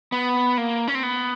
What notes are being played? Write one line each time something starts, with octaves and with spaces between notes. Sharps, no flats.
B3
A#3
C#4
C4
B3